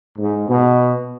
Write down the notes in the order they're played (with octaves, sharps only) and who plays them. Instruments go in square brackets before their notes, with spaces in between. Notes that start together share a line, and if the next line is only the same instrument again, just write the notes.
[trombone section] G#2
B2